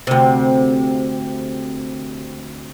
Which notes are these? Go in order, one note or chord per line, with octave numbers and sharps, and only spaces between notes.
D2 C3